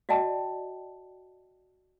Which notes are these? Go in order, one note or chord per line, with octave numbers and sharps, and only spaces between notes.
F#4 D5 D#5 G5 A5